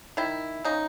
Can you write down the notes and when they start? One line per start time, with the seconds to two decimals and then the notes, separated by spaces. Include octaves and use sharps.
0.17 D#3 E4
0.64 C#3 D#4